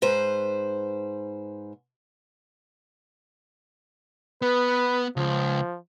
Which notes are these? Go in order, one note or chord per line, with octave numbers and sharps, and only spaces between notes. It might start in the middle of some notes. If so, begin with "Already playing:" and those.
G#2 B4 C5
B3 B4
C#2 F3